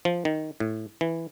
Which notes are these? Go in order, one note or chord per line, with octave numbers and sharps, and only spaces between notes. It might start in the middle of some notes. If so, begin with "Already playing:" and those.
F3
D#3
A2
E3